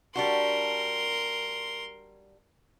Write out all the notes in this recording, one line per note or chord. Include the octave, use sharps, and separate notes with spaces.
G3 D4 F#4 A#4 C6